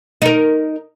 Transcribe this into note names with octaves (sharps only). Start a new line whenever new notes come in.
D#4 A#4